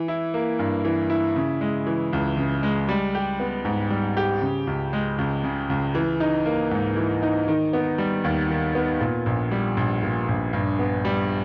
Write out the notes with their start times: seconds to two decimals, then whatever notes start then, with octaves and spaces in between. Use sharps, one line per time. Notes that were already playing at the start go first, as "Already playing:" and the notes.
Already playing: E3
0.08 E4
0.34 A#3
0.59 G2
0.85 E3
1.10 E4
1.36 C#3
1.61 G#3
1.87 E3
2.13 C#2
2.38 C#3
2.63 G#3
2.89 G3
3.15 G4
3.40 B3
3.65 G#2
3.90 G3
4.17 G4
4.42 C#3
4.67 C#2
4.93 G#3
5.18 C#2
5.44 C#3
5.70 C#2
5.95 E3
6.20 D#4
6.46 A#3
6.71 G#2
6.96 E3
7.23 D#4
7.48 D#3
7.73 B3
7.98 G3
8.24 D#2
8.50 D#3
8.75 B3
9.01 A#2
9.26 A#1
9.51 G3
9.77 A#1
10.03 A#2
10.28 A#1
10.53 G2
10.79 B3
11.05 G3